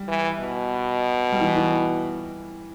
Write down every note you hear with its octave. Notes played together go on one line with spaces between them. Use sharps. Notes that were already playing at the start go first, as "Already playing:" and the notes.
Already playing: G3
E3
B2
G3
E3
E3